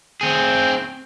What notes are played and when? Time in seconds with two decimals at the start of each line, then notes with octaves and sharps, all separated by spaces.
0.21 C4 G#4